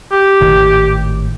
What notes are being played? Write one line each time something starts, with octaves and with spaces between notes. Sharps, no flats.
G4
G#1 A2 D#3